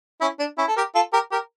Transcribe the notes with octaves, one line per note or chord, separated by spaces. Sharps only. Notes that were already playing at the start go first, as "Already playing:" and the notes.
C#4 E4
D4
C#4 E4
A4
G4 A#4
F4 A4
G4 A#4
G4 A#4